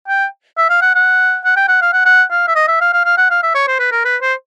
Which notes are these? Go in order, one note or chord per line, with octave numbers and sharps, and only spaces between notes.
G5
E5
F5
F#5
F#5
F#5
G5
F#5
F5
F#5
F#5
F5
E5
D#5
E5
F5
F5
F5
F#5
F5
E5
C#5
C5
B4
A#4
B4
C5